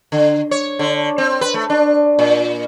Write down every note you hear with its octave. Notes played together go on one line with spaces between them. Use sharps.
D3
C#5
D3
C4
B4
A3
D4
A#2